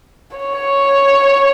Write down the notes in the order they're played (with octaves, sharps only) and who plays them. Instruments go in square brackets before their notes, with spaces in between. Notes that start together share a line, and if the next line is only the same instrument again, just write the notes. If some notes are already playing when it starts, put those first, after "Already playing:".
[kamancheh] C#5